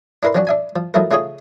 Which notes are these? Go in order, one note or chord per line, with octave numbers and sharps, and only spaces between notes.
D4 E4 A#4 B4 C6
F3 F#3 C#4 D4 F#4
D4 E5 G#5
F3
F3 F#3 A3 D#4 E4 A#4
C#3 A3 D#4 F4 G#4 C#5